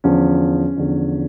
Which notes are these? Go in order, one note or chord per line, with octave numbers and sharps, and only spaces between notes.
E2 D3 F3 C#4
E2 D3 F3